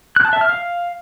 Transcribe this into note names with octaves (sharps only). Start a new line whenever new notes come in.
F#6
A5
E5
F6
F5